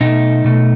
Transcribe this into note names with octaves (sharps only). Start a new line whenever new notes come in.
B2 A3 D#4
B2 A3